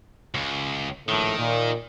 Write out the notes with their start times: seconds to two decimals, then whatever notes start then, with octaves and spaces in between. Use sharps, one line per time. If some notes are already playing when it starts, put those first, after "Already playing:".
0.34 C#2
1.09 A#1 A2 D#3 A4
1.39 A#2